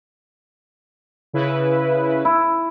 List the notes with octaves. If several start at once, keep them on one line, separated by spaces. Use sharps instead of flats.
C#3 E4 B4
E4